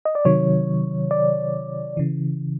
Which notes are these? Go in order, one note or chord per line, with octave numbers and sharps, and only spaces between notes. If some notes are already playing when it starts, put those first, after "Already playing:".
D#5
D5
C3 D#3 F#3 C#5
D5
C#3 E3